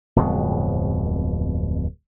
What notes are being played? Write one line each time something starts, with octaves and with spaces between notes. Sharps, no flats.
D1 F2 B2 G#3